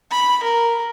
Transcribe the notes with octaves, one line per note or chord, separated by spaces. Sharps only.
B5
A#4